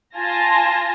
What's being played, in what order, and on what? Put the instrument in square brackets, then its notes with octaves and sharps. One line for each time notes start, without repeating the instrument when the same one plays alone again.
[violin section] F4 G#5 A5 A#6